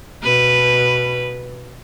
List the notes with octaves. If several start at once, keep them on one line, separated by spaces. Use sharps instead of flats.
B2 B4